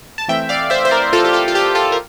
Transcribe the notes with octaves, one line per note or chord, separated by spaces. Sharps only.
A5
E3 A3 C4 E5 G5
D5 F5
C5 E5
C5
A#4 D5
F4 A4
G4
F4 A4
F4
G4
F4 A4
A#4